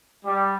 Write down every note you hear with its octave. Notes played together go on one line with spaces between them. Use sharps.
G3